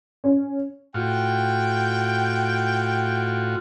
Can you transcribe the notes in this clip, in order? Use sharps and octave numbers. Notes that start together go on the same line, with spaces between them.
C#4
A2 F4 F#4 G5